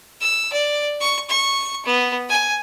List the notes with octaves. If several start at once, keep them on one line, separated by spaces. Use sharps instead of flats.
E6
D5
C#6
C#6
B3
G#5